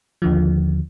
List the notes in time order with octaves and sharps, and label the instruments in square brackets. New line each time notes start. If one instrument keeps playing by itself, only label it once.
[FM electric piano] D#2 D3 F3